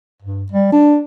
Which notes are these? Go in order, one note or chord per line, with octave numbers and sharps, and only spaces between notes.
G2
G3
D4